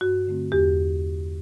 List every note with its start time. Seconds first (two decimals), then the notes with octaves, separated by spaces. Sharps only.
0.01 G2 F#4
0.27 D3 A3 C4
0.52 E2 G4